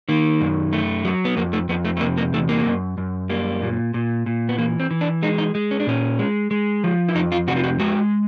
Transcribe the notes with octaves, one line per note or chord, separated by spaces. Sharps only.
D#3 A#3
F#2
A3
F#3
B3
F2 A#3
A3
F2 B3
A3
A3
C3 A#3
A#3
E2 A3
A#3
F#2
F#2
G3 A#3
A#2
A#2
A#2
B3
E3 A#3
C4
E3
D4
G#3 D#4
D#4
G#3
C#4
D4
A#2 C#4
G#3
G#3
F3
E4
F2 D#4
F4
C3 F#4
F4
F#4
G#3 F#4